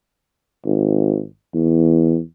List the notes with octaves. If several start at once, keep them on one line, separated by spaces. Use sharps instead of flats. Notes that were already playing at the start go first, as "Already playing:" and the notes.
G#1
E2